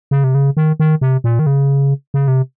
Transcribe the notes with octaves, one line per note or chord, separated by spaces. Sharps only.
C#3
C3
C#3
D#3
D#3
C3
A#2
D#3
C#3
C#3
C3